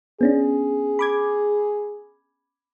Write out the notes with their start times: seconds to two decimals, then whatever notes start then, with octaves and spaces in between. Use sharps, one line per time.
0.21 B3 C#4 D4 G#4
0.99 B5 D6 G#6